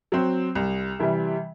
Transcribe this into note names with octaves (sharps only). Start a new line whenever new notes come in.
F#3 C4
C2
C3 E3 G3